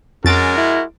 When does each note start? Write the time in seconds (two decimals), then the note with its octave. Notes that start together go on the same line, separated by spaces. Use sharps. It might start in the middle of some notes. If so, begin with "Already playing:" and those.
0.25 F2 G#3 C#4 F#4 A#4 A6 D7
0.57 E4